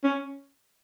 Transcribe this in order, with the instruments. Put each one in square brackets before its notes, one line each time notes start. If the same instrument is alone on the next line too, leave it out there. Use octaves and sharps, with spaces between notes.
[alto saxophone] C#4